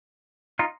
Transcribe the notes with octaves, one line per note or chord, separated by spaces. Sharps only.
D#4 F4